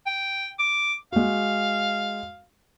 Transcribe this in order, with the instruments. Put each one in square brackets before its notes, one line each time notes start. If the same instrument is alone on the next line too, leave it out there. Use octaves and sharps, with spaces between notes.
[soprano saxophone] G5
D6
[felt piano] G#3 F#4 [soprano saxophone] F5